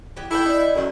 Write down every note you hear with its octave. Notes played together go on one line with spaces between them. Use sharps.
E3 B3 G4
E4 A4 A#4 G5
D#4 D5
F#2 D3 D#3